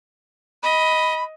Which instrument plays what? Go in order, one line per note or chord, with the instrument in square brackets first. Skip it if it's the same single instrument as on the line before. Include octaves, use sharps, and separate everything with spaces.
[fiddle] D#5 [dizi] B5